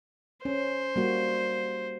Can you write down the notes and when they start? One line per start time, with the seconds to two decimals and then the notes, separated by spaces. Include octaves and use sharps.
0.45 C#4 C5
0.96 G3 A#3 F#4